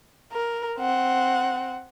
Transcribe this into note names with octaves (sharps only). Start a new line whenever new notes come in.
A#4
C4 F#5